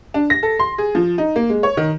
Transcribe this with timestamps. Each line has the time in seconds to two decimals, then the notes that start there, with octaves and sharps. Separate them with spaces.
0.14 D4
0.30 A#6
0.43 A4
0.59 C6
0.78 G#4
0.95 F3
1.18 D#4
1.36 A#3
1.49 G#3
1.63 C#5
1.77 D#3